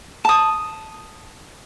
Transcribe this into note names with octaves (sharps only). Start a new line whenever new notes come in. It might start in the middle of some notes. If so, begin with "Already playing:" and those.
A5 D#6